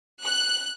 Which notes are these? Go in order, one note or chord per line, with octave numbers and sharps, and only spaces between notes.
F#6